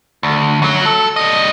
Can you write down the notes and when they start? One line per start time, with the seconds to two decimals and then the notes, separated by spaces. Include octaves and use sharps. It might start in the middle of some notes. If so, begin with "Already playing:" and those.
0.23 D2
0.62 F#2 F#3
0.86 A4
1.16 G3 D#5